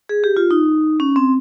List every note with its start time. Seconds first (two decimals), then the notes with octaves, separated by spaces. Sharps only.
0.09 G#4
0.24 G4
0.37 F4
0.51 D#4
1.00 C#4
1.16 C4